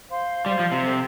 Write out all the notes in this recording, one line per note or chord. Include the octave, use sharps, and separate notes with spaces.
C5 F5 C6
G3 C5 F5 C6
F3
C3
A4 C5 G5